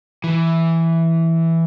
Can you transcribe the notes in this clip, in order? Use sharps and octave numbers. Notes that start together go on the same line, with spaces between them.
E3